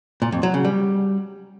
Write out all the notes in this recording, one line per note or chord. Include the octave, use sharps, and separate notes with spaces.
A#2
F2
F#3
C#3
G3